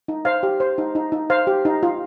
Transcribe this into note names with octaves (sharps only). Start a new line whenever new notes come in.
D#4
C5 F5
G4
C5
D#4
D#4
D#4
C5 F5
G4
D#4
F4